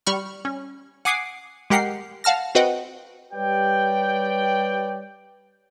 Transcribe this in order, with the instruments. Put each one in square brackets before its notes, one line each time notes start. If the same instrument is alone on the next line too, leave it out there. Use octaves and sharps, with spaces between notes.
[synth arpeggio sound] G3 B5 C#6 F6
C#4
F#5 G#5 D6 D#6 C7
G#3 G4 A#4 F#5 G5 C7
F5 F#5 A5 F6 A#6
C4 F#4 B4 D#5 F#5 G5
[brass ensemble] G3 G4 B4 C#5 D5 G5